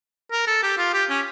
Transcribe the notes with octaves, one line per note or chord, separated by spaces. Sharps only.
A#4
A4
G4
F4
G4
C#4